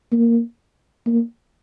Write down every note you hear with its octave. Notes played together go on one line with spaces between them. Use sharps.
A#3
A#3